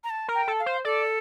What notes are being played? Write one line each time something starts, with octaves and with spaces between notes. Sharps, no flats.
A#5
A5
A#4
G5
A4
F5
C5
A4 D5